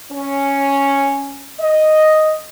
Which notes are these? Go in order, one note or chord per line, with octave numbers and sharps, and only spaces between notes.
C#4
D#5